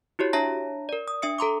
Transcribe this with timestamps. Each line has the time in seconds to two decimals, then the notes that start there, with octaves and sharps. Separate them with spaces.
0.19 E4 F#4 G4 C#5
0.33 D4 C#5 E5 A5 A#5 A#6
0.89 A#4 D5
1.08 D#6
1.22 D4 E5 D#6 C#7
1.38 A4 A#5 C6 D6